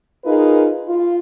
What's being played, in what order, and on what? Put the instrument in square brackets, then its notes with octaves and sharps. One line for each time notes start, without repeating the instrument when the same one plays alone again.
[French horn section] D#4 F4 G#4 A#4 B4
F4